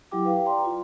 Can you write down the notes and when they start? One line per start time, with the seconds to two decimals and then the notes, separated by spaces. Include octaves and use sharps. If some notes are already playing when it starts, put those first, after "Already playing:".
0.11 F#3 E4 G4 G5 D6
0.25 B4 F5 G5
0.46 D5 G5 A#5 C6
0.65 F4